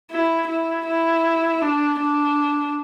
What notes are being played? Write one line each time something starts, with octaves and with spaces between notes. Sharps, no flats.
E4
E4
E4
D4
D4